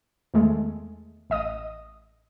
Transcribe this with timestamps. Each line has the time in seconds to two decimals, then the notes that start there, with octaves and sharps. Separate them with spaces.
0.34 E2 D#3 G#3 A3
1.30 A1 D#5 D#6